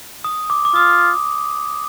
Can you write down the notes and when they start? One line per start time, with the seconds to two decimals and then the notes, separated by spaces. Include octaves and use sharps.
0.24 D#6
0.50 D6
0.65 D6
0.75 F4 D#6